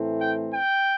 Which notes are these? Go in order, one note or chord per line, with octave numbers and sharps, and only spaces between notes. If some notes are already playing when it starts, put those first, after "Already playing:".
Already playing: A2 E3 A3 C4
G5
G5